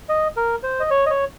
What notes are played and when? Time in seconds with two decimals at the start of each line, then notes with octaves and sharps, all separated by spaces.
0.09 D#5
0.37 A#4
0.63 C5
0.80 D#5
0.91 C#5
1.06 D#5
1.10 C#5